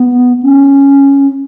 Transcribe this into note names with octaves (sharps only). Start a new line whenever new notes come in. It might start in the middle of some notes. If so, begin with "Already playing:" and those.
Already playing: B3
C#4